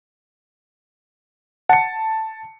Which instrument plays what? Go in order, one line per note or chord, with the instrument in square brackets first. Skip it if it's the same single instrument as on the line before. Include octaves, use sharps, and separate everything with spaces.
[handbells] F#5 [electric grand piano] A5 C#7